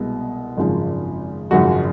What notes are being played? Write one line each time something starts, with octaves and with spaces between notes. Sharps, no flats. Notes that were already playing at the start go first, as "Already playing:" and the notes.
Already playing: C2 B2 G#3
G#1 F#2 C#3 F3
G#1 F#2 C#3 F3 F#4